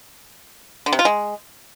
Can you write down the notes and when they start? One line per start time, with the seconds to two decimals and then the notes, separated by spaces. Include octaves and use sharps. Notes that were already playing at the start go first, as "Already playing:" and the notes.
0.86 D3
0.93 C3
0.99 F4
1.05 G#3